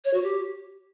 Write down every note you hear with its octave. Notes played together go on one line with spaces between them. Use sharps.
C#5
F#4
G4